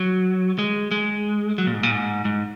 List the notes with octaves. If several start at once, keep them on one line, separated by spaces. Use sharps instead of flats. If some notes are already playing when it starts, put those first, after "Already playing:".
Already playing: F#3
G#3
G#3
F#3
A#2
G#2
A#2
G#2
G#2